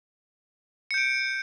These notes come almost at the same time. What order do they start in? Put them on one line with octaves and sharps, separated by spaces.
C#7 G6 D7